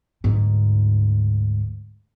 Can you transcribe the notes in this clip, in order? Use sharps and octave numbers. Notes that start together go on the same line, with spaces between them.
D2 G#2